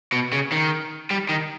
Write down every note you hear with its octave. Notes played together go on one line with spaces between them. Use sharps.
B2
C#3
D#3
G3
D#3